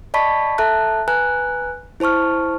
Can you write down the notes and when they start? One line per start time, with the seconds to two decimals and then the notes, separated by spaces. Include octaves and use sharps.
0.14 D5 D#5 A5 B5 C#6 B6
0.58 A4 E5 A5 A#5 F#6
1.08 B4 G#5 A#5 F#6
2.00 E4 C5 A5 C#6 F6